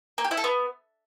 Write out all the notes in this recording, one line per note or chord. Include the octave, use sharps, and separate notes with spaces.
A#3
G4
E4
A4
B3